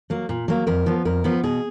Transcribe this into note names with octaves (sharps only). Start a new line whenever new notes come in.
F#3 A#3
A#2
F#3 A#3
F2 A#4
F3 B3
F2 A#4
F3 B3
B2 G#4